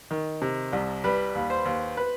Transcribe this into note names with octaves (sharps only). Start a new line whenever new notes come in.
D#3
C3
C2
G3 B4
D#2
C5
D#2
B4